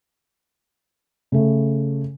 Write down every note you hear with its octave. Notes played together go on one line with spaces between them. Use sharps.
C#3 A3